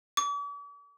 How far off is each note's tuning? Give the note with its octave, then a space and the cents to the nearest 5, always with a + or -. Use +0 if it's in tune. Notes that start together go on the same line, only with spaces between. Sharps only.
D6 -45